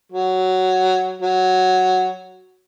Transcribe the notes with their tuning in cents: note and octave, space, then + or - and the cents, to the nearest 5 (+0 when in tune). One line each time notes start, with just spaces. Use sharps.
F#3 +5
F#3 +0